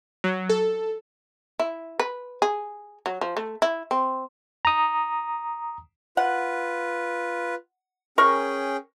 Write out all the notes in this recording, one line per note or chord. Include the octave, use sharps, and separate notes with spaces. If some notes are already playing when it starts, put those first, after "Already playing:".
F#3
A4
E4
B4
G#4
F#3
F3
A3
E4
C4
A#5 D#6
F4 B4 F#5
C#4 G#4 A#4 G5 C#6